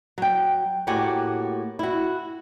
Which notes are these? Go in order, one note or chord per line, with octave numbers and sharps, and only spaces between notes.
F#3 G5
A2 A#3 F#4 G4 F#5 G#5
E4 F#4